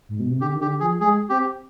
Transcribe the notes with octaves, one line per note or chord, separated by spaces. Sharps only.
G#2
B2
C3
D3 G4
D#3
D3 G4
F3 G#4
G#3 G#4
C4 G4